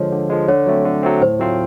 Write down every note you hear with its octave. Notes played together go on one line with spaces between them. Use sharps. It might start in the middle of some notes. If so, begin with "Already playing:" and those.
Already playing: D3 F3 G#3 C#5
D3
F3 G#3
D3 C#5
F#3 A3 C4
D3
F#3 A3 C4
A2 C5
F#3 A3 C4 F4